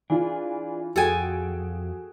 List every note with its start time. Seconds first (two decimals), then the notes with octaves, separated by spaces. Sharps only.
0.10 E3 D4 F4 G#4
0.96 F2 F#4 G#4 A4 G5 G#5